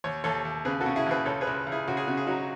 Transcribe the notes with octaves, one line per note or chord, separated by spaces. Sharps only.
D#2 C#5
D#2 A4 C#5
D#2
C#3 G#4 B4
F#4 A4
C#3
E4 G#4
D#2 G#4 B4
C#2 A4 C#5
G#4 B4
C#2
C#2
E4 G#4
C#2 F#4
G#4
C#3 F#4
G#4
F#3 D#4 F#4